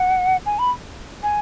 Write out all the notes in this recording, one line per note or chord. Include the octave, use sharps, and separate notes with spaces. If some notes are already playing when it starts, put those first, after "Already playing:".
Already playing: F#5
G#5
B5
G#5